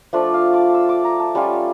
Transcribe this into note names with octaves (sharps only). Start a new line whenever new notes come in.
F3 A3 D4 F4 D5
F5
D6
E6
D6
A#5
A5
G3 C#4 F4